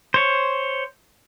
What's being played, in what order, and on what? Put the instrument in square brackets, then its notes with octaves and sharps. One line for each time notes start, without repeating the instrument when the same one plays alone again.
[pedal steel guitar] C5 C#5